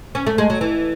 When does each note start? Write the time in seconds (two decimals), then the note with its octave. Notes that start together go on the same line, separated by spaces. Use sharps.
0.15 C#4
0.27 A3
0.38 G#3
0.50 F#3
0.61 E3